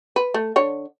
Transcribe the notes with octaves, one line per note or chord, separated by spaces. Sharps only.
B4
A3
D3 C#5